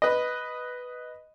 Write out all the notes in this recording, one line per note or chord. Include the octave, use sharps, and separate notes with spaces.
B4 D#5